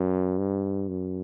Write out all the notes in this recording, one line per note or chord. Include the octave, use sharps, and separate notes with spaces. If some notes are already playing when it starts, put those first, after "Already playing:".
Already playing: F#2
G2
F#2